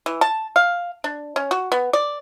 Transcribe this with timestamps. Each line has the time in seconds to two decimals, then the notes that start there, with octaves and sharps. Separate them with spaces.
0.06 E3
0.21 A5
0.56 F5
1.04 D4
1.36 C#4
1.51 F#4
1.72 B3
1.93 D5